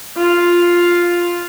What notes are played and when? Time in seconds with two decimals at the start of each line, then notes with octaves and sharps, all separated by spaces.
0.17 F4